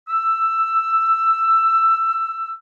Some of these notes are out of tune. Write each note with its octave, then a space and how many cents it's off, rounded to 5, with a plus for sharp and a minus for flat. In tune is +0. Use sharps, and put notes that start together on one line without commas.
E6 +10